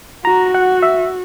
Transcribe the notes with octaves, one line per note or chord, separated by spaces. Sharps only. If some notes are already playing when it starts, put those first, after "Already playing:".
F#4 A#5
F#5
E5